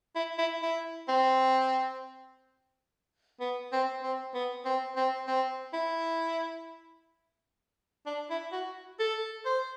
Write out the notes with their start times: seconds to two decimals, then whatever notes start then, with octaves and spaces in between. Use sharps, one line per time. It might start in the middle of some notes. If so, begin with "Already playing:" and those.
0.16 E4
0.38 E4
0.62 E4
1.09 C4
3.40 B3
3.72 C4
4.03 C4
4.35 B3
4.65 C4
4.96 C4
5.27 C4
5.73 E4
8.06 D4
8.30 E4
8.52 F#4
9.00 A4
9.46 C5